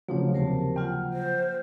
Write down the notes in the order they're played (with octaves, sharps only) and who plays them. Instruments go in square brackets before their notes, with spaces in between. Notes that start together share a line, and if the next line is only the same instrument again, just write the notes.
[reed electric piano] C#3 F3 F#3 [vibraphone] A3 D4 C#5
[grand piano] D#2 C3 [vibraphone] A#4 C5 A5
[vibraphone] A#3 F4 F#5 [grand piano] G5 F6
[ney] C5